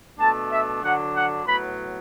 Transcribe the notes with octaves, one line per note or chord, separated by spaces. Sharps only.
B2 A3 D4 A5
E5
D3 F#3 D4 F#5
F#5
A2 F#3 B3 B5